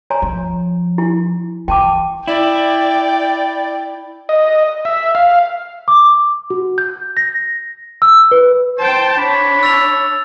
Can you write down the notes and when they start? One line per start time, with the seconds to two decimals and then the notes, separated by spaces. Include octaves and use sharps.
0.10 C#5 G#5 A#5
0.22 F3
0.98 E4 G#5
1.68 E3 G5 A5 D6
2.27 E4 D5 G5
4.29 D#5
4.85 E5
5.15 F5
5.88 D6
6.50 F#4
6.78 G6
7.17 A#6
8.02 E6
8.31 B4
8.79 C5 G5 A5
9.18 D4 C#5 B5
9.63 E6 A6 F7